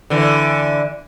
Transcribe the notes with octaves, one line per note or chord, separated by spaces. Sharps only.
D3 E3